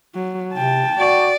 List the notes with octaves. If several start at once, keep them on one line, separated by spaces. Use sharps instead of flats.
F#3
C3 G5 A5
F#4 D5